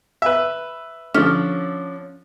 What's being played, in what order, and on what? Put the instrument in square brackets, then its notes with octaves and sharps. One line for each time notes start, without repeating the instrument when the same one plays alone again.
[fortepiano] B4 E5
[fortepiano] D3 F3 [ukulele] C#4